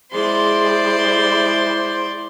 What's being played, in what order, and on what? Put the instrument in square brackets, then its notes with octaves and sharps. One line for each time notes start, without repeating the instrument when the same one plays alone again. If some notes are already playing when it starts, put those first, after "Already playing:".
[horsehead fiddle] G#3 E4 [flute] G#4 [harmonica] C5 [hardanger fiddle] D5 C6